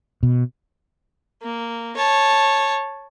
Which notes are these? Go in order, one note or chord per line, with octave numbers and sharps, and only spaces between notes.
B2
A#3
C#5 A5